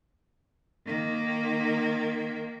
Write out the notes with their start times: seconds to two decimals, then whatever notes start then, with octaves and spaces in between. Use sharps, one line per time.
0.86 D#3 A#3